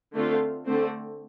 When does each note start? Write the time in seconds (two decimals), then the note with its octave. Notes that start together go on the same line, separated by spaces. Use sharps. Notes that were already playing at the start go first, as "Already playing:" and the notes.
0.15 D3 A3 C4 F4
0.66 D3 A3 C4